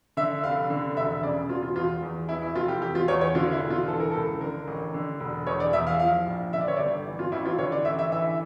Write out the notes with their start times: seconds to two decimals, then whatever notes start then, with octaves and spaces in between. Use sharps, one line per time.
0.17 D3 E5
0.43 F1 F5
0.70 D3
0.96 E1 E5
1.23 C#3 D5
1.49 E1 F4
1.63 F4
1.76 E2 F4
2.02 E2
2.29 E3 E4
2.42 E4
2.55 F1 F4
2.68 G4
2.82 E2 G4
2.95 F4
3.08 E2 C#5
3.21 C#5
3.35 D3 F4
3.52 E4
3.61 E1
3.70 F4
3.88 E3 A4
4.00 A#4
4.12 C#2 A4
4.40 D3 A#4
4.67 A1
4.94 D3
5.20 E1
5.47 E2 C#5
5.60 D5
5.73 E2 E5
5.87 F5
6.00 F3 F5
6.26 A#1
6.53 D3 E5
6.61 D5
6.68 C#5
6.76 G1 D5
7.06 E3
7.19 F4
7.32 A1 E4
7.45 F4
7.58 D3 C#5
7.72 D5
7.85 A1 E5
7.99 E5
8.12 E3 E5